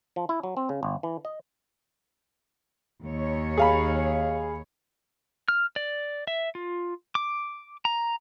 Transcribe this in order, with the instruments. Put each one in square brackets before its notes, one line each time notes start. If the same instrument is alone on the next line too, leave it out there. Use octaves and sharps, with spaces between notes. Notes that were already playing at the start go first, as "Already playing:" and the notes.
[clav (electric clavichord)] F3
E4
F#3
C4
C#3
G1
E3
D#5
[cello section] D#2 C#5
[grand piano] G#4 F5 B5
[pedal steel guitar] F6
D5
E5
F4
D6
A#5